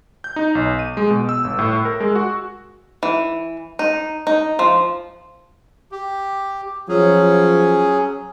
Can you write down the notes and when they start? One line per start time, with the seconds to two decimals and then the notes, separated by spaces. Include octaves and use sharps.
0.24 G6
0.36 D#4
0.55 B1
0.79 D#7
0.97 G#3
1.10 B2
1.29 E6
1.44 G1
1.59 A2
1.85 A#4
2.00 G#3
2.15 F#4
3.03 E3
3.79 D#4
4.27 D#4
4.59 F3
5.92 G4
6.89 F3 F#3 C#4 G#4